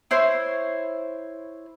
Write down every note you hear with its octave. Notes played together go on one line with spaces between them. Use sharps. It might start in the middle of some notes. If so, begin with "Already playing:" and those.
E4 C5 C#5 C6